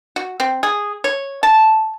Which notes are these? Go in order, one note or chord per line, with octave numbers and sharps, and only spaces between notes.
F#4
C4
G#4
C#5
A5